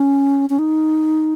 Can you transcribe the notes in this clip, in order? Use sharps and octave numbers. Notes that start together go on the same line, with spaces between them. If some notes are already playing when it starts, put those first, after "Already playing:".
Already playing: C#4
C#4
D#4